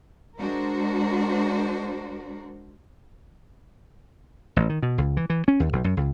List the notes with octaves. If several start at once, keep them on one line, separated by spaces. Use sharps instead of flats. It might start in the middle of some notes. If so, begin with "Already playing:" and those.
G#3 D4 F#4 A#4 C5
A1
D#3
B2
C#2
E3
E3
C#4
D#2
B1
F#2
C#2